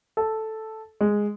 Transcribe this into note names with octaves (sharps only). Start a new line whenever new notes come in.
A4
G#3